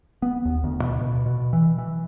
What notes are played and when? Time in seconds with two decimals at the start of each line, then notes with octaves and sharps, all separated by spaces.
0.22 B3
0.45 D#2
0.64 D2
0.82 B2
1.00 B2
1.26 B2
1.53 E3
1.78 E3